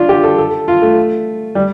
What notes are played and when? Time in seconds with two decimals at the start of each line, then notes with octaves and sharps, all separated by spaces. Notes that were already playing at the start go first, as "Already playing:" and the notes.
Already playing: D4 F4
0.09 G4
0.23 A4
0.38 A4
0.68 F4
0.82 A3
1.55 G3